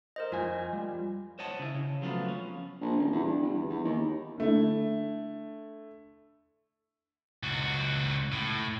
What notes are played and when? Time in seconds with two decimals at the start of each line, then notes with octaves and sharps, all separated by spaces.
0.16 A#4 C5 D#5
0.32 F2 F4 G#5
0.73 G3
1.39 C5 C#5 D#5 F#5 A5
1.59 C#3 E4
1.74 C#3
2.02 F3 F#3 A3 B3 F4
2.28 C#4
2.81 A#1
2.97 D#1
3.12 E2
3.25 G2
3.42 G1
3.54 E2
3.69 E2
3.84 D#2
4.38 D3 A3 E4
7.43 C#2 F#4
8.32 A2